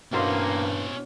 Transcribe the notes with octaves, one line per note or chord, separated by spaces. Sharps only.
G2 B2 A#3 C#4 E4 G4 C5